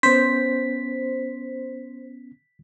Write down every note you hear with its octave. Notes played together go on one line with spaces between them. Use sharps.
B3 C#4 C5 B6